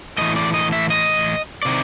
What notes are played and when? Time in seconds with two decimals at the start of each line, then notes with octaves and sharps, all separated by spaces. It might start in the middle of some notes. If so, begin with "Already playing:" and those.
0.18 A2 E3 D#5
0.36 D5
0.54 D#5
0.72 E5
0.90 D#5
1.63 C3 D#3 D5